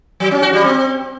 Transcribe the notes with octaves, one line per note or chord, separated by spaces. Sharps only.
F#3
C#4
F#4
G3
C4